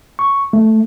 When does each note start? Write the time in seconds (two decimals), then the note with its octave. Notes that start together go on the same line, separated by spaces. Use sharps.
0.19 C#6
0.53 A3